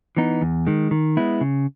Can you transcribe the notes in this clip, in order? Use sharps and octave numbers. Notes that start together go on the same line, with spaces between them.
E3 B3 D#4
E2
D#3 G#3
D#3
G#3 B3 E4
C#3